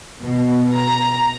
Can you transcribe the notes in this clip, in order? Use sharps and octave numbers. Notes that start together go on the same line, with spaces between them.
B2
A#5